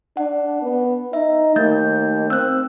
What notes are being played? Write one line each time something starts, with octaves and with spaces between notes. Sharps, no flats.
D4 F#5
B3
D#4 E5
D#2 A3 G6 A6
C4 E6 F#6